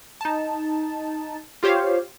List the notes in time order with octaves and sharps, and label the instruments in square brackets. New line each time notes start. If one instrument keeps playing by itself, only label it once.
[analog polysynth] D#4 A5
F4 G4 C5 C#5 F5